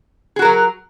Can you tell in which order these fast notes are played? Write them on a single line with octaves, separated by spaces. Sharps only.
G#4 F#4 A#4 F#3